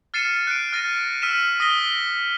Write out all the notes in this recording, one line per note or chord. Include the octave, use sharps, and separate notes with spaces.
F6 A6 C7 C#7 D#7 E7
F#6 D7
F6 A6 A#6 D#7
E6 F6 B6 D#7 E7
D#6 A#6 B6 G7